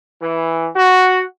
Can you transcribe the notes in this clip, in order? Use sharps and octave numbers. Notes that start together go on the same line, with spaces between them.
E3
F#4